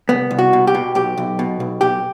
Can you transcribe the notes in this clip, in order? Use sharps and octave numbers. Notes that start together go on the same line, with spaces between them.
C2 B3
C2
F#4
B2
G4
B2
B1 G4
B1
B2
B1
B1 G4